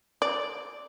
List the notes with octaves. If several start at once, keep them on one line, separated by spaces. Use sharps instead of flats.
D5